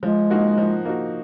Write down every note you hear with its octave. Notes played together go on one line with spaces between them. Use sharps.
F3 G#3
A#3 D#4 F#4
F3
A#3 D#4 F#4